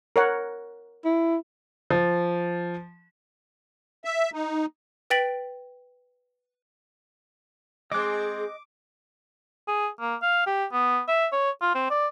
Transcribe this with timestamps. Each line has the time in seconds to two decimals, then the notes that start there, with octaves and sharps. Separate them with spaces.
0.16 A#4 C#5 F#5
1.05 E4
1.90 F3
4.05 E5
4.33 D#4
5.10 B4 G5 A6 B6 D7 F#7
7.92 G#3 C4 G#4 D#5 D6 F#6
9.68 G#4
10.00 A#3
10.22 F5
10.46 G4
10.72 B3
11.09 E5
11.32 C#5
11.62 F4
11.75 C4
11.90 D5